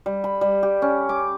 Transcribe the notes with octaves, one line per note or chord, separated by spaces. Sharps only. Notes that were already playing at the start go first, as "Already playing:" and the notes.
G3
B5
G3
G4
C#4
D6